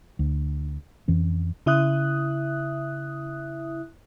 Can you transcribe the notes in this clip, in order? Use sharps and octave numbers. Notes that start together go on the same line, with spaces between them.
D2
F2 E3 C#4
C#3 E4 E5 D#6 F#6